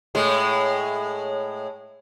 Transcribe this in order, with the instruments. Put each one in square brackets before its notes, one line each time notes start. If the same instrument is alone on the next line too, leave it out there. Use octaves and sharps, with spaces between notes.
[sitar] A2 G#3